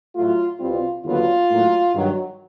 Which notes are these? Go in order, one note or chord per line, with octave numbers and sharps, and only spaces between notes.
A2 F#3 A3 F4
C2 B2 G3 C4 F4
D#2 D3 F#3 B3 F4
A2 F#3 A#3
G2 D#3 F#3